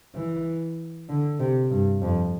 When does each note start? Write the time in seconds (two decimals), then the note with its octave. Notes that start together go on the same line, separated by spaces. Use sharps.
0.15 E3
1.09 D3
1.40 C3
1.71 G2
2.02 F2